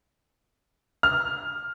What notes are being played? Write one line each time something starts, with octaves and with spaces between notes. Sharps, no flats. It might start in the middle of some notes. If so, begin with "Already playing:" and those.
F6